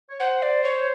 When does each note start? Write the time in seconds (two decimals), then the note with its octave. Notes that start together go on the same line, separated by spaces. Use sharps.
0.10 C#5
0.20 C5 F#5
0.42 D5
0.64 C#5